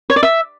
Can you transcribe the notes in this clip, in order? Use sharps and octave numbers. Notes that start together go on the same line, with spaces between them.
C#5
D5
E5